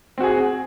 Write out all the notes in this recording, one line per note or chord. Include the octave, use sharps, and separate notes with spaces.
C4 F#4 G#4